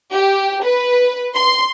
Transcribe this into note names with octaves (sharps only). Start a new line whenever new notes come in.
G4
B4
C6